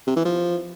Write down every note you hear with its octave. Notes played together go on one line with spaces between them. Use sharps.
C3
E3
F3